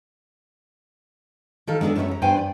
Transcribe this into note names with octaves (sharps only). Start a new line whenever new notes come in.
D#3 A4 F5
G#3 B3 D4 A4 G#5
F#2 B3 C#4 F4 C#5 E5
G#3 A#5
G2 B3 B4 C5 G5 G#5
D5